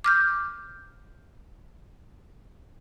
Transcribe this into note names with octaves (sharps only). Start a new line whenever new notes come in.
D6 F6 G6